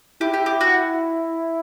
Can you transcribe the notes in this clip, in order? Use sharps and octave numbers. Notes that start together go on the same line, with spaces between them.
E4 G4
G4
G4
F#4